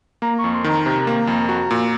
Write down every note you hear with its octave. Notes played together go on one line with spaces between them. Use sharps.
A#3 A#5
C#6
F2
C6
D#3 A#5
C3 A#5
A#3
F2
F#4
A#2